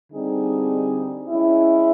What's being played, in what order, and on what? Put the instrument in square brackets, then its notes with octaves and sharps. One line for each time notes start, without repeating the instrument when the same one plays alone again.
[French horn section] D3 G3 C4 D#4 G#4
G#3 C#4 E4